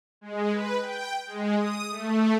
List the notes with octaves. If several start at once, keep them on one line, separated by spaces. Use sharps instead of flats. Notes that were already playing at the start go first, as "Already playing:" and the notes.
G#3
B4
G5
G#3
D#6
A3